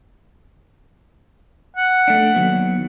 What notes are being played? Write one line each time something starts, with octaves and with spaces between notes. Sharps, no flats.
F#5
A3 D4
D#2 F#3 B3